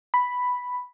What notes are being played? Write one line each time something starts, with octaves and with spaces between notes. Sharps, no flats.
B5